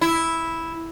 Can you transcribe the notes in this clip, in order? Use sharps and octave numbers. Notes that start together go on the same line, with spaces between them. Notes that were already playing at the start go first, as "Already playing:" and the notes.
E4